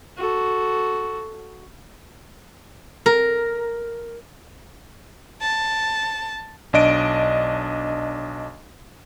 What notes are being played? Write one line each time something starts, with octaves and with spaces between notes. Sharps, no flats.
F#4 A4
A#4
A5
B1 D4 D#5 D7